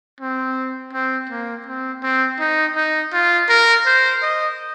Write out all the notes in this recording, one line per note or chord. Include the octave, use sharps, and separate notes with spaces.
C4
C4
A#3
C4
C4
D#4
D#4
F4
A#4
C5
D#5